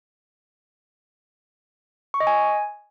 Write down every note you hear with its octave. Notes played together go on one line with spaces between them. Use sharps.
C#6
D#5
G#5